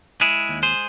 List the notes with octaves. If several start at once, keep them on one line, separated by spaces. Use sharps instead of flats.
G#3 E4 G#4
D#2
G#4 C5